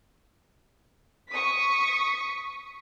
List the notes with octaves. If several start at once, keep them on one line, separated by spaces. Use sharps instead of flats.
C#6 D#6 B6